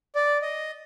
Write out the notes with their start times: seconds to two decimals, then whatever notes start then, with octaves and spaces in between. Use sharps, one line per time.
0.15 D5
0.42 D#5